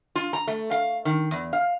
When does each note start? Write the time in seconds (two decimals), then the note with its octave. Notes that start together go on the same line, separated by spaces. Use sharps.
0.16 F4
0.33 A#5
0.47 A3
0.71 F5
1.05 D#3
1.31 E2
1.53 F5